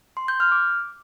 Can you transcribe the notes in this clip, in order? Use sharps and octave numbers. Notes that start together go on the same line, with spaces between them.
C6
G6
F6
D6